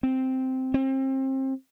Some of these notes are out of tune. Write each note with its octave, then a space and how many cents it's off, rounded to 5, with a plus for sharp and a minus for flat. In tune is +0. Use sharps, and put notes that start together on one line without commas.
C4 -5
C4 +30